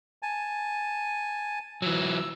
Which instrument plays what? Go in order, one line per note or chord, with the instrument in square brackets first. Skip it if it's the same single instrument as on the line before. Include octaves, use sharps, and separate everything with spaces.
[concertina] G#5 A5
[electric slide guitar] E3 F#3 [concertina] E6